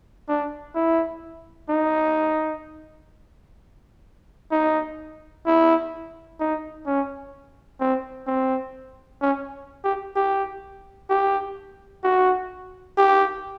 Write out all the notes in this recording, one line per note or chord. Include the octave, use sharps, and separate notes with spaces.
D4
E4
D#4
D#4
E4
D#4
C#4
C4
C4
C#4
G4
G4
G4
F#4
G4